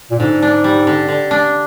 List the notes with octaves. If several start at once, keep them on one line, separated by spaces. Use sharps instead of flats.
A#2
G#2 D3
D4
G3
D3
D3
D4